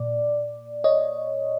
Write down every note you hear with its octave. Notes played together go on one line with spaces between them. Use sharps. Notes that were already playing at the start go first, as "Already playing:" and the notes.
Already playing: A#2 D5
C#5 D#5